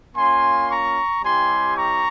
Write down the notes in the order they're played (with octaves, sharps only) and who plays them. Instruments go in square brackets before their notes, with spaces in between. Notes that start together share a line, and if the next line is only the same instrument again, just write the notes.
[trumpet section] A#3 C#4 F4 G#5 C6
A#5 C#6
G3 C4 E4 G4 G#5 C6
A#5 C#6